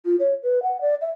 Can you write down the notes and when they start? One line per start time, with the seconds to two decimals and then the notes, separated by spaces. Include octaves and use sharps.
0.05 F4
0.20 C#5
0.43 B4
0.63 F#5
0.81 D5
1.01 E5